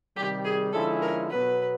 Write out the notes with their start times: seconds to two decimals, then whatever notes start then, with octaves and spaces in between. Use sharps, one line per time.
0.16 C3 D#3 G3 G4
0.44 G#4
0.73 D3 F3 G#3 C#4 E4 A4
1.02 A#4
1.30 B2 F#3 B3 B4